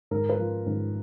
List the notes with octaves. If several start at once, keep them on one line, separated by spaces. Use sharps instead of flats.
G#2 A#4
B4
F3
G#2